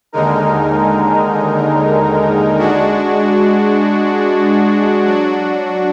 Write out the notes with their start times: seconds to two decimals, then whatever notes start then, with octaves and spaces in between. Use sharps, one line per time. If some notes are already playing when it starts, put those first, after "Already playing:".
0.13 D#2 D3 G#3 D#4 A#4
2.58 G#3 D4 F#4
5.05 F#3 D4 F#4